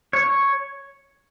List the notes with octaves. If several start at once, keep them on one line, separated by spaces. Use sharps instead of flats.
C#5